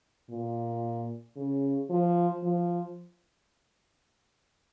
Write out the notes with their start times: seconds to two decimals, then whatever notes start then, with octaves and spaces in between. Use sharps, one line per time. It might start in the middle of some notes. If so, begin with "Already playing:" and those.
0.30 A#2
1.36 C#3
1.90 F3
2.44 F3